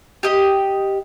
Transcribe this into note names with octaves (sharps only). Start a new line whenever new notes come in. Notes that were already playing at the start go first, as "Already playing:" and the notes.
G4 D#5